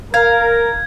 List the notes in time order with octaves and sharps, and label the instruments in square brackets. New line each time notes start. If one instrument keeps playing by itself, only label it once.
[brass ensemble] A#4 [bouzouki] F5 [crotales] G#6